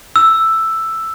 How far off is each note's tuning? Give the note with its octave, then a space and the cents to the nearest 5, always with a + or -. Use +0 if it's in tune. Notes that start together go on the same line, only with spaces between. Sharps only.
E6 +5